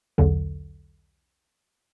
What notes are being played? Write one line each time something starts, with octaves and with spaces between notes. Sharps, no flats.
B1 E2 D3